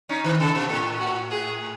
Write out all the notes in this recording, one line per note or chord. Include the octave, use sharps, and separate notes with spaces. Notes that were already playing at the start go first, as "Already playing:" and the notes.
C#4 D#4
D#3
C#3 A4
B2
A2 A4
F#4
G#4